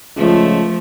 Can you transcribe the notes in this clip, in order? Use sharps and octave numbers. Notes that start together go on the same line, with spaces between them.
C#2 F3 A3